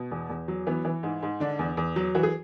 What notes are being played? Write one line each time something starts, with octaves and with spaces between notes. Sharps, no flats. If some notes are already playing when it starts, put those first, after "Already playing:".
Already playing: B2
E2
E2
F#3
E3 B3
E3
G#2
G#2
D3 D4
E2
E2
F#3
E3 F#4
G#4